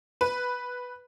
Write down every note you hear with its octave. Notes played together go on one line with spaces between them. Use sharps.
B4